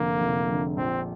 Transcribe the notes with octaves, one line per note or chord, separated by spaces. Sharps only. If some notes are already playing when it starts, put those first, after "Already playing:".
Already playing: F1 F2 D3 A#3
F1
F2 D3
A#1 C4